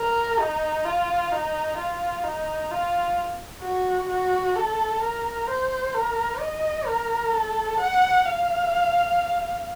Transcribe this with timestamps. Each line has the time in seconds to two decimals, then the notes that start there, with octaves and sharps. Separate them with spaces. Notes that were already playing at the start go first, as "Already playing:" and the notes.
Already playing: A#4
0.40 D#4
0.85 F4
1.32 D#4
1.78 F4
2.24 D#4
2.71 F4
3.63 F#4
4.09 F#4
4.56 A4
5.02 A#4
5.48 C5
5.95 A#4
6.40 D#5
6.87 A#4
7.33 A4
7.80 F#5
8.25 F5